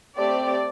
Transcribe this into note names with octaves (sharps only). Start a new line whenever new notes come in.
A3 C4 G4 D5